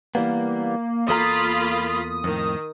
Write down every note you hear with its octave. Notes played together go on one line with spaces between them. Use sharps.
E3 G3 A#3 B3
E2 A#3 F4 A4 A#5 B5 D#6
F2 A2 D#3